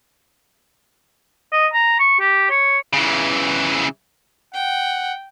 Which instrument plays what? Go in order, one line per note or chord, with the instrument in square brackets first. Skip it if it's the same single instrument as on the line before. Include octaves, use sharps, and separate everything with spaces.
[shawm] D#5
A#5
C#6
G4
C#5
[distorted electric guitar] C#3 E3
[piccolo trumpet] F#5 [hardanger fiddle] G5